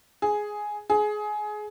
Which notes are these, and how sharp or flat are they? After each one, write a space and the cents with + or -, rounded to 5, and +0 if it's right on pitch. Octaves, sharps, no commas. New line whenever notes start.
G#4 +5
G#4 +20